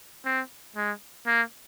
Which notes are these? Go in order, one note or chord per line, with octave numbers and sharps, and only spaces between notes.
C4
G#3
A#3